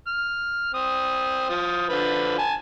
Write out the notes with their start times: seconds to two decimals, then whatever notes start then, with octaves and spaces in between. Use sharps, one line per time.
0.07 F6
0.74 C4 D#6
1.50 F3 D#6
1.89 D3 F3 B4
2.38 G#5 A5